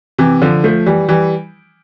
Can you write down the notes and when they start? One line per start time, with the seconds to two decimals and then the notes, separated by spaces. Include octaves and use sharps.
0.18 C3 E3
0.42 D3 F3
0.64 F3 A3
0.86 E3 G3
1.09 E3 G3